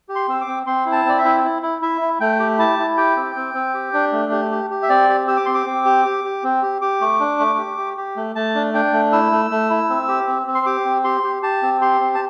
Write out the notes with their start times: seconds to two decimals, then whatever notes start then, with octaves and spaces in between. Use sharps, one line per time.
0.09 G4
0.15 C6
0.28 C4 E6
0.41 D6
0.47 C4
0.67 C4 C6
0.86 E4
0.92 A5
1.05 C4 D5
1.18 E5
1.24 E4
1.44 E4
1.62 E4
1.82 E4 E5
2.01 E4
2.20 A3 G5
2.40 G4
2.59 E4 A5
2.79 E4
2.97 G4 G5
3.17 C4
3.36 C4
3.54 C4
3.74 G4
3.94 D4
4.12 A3
4.32 G4
4.51 G4
4.70 G4
4.83 E5
4.89 C4 D5
5.09 G4
5.28 G4 E6
5.37 D6
5.46 C4 C6
5.55 D6
5.66 C4
5.85 G4
6.05 G4
6.24 G4
6.44 C4
6.63 G4
6.82 G4 D6
7.01 A3
7.20 D4
7.39 A3
7.58 G4
7.78 G4
7.97 G4
8.17 A3
8.35 A3 A5
8.55 D4
8.74 D4 G5
8.93 A3
9.12 E4 E6
9.32 A3
9.51 A3
9.70 E4
9.90 C4
10.08 G4
10.28 C4
10.47 C4
10.55 C6
10.66 G4 D6
10.85 C4
11.04 G4 C6
11.23 G4
11.43 G4 A5
11.63 C4
11.81 G4 C6
12.01 C4
12.15 A5